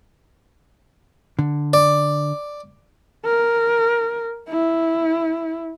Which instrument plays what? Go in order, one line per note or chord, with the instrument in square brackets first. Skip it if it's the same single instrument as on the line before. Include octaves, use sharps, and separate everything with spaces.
[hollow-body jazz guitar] D3
[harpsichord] D5
[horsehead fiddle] A#4
E4